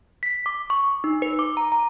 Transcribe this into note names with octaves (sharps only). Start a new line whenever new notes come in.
B6
D6
C#6
D#4
B4
D6
A#5
A#5